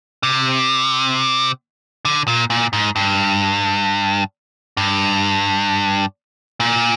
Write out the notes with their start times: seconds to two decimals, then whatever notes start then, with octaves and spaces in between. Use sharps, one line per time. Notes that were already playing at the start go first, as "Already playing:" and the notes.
0.23 C3
2.05 D3
2.28 A#2
2.50 A#2
2.73 G#2
2.96 G2
4.77 G2
6.60 A#2